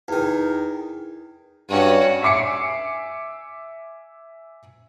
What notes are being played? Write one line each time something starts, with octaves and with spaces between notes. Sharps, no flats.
E2 D#3
G2 C#4 F#4
E5 G#5 D6 C7 C#7